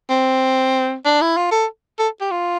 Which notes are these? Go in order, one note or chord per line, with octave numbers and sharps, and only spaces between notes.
C4
D4
E4
F4
A4
A4
G4
F4